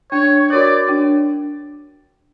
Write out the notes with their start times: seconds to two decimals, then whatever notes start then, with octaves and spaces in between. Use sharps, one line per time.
0.11 D4 C#5
0.50 F#4 A#4 C#5 D5
0.89 D4